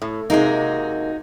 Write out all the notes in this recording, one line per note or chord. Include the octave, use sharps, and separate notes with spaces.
A2
C3 G#3 A#3 D#4 F#4